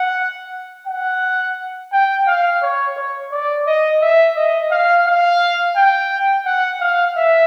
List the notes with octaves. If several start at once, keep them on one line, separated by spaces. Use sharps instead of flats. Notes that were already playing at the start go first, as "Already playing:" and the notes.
Already playing: F#5
F#5
G5
F5
C#5
C#5
D5
D#5
E5
D#5
F5
F5
G5
F#5
F5
E5